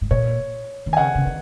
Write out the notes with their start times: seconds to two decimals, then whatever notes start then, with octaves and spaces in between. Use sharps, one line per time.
0.01 G#2
0.11 A#2 C#5
0.86 D#3
0.93 G#5
0.97 C#3 F#5
1.15 C#3
1.26 D#3